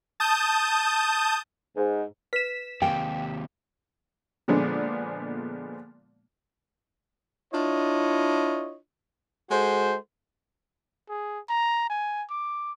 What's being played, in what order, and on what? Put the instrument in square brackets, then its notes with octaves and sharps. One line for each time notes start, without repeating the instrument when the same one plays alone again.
[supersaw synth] A5 D#6 G6
[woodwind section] G#2
[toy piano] B4 [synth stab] B6 E7
[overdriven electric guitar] D#2 C3 [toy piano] F5 G#5 [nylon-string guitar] G5
[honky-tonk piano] A#2 D3 F3 G#3 B3 D4
[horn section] D4 E4 F4 C#5 D#5
G#3 F#4 A4 C5
[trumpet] G#4
A#5
G#5
D6